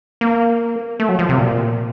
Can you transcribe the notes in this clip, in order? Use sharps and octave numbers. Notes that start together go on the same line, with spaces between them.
A#3
A3
F#3
F3
C3
A#2